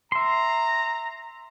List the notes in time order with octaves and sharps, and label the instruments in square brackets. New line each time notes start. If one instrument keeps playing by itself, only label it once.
[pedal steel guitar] E5 C6 [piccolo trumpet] A#5